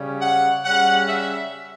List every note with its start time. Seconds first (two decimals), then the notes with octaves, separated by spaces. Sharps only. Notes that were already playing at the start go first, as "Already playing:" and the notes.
Already playing: C#3 G3 C#4
0.22 F#5
0.65 C#3 G3 C#4 F#5
1.09 E5